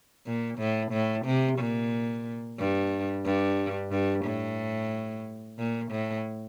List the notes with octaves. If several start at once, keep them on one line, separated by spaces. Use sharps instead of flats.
A#2
A2
A2
C3
A#2
G2
G2
G2
A2
A#2
A2